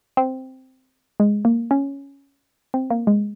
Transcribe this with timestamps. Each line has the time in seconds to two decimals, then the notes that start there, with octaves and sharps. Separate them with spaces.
0.17 C4
1.20 G#3
1.45 A#3
1.71 C#4
2.74 C4
2.90 A#3
3.07 G#3